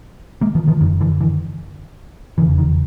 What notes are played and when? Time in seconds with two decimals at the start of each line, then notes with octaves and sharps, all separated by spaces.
0.41 G#3 A#3
0.55 D#3 F3
0.68 D#3 F3
0.81 F#1 F#2 D3 D#3
1.01 D3 E3
1.20 D3 E3
2.38 F1 E2 C#3 E3
2.58 D#3